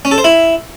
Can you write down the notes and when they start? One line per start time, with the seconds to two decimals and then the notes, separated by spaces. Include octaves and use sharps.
0.05 C#4
0.11 A4
0.18 C5
0.24 E4